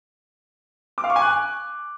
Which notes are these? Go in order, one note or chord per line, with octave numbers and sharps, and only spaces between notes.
D6
F5
C#6
G#5
F#6